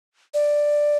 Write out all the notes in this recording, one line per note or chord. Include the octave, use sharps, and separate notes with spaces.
D5